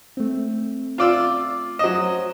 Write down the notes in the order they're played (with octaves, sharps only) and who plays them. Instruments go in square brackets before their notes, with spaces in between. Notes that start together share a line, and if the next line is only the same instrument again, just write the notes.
[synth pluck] A3 C4
[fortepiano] F4 D5 E6
[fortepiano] F#3 D#5 [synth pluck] C5 E7